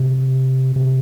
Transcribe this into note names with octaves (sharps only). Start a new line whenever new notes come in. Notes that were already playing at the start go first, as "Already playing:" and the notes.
Already playing: C3
C3